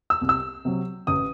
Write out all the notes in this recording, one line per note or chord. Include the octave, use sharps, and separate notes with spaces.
E6
C2
E6
C3 F#3
A1 D#6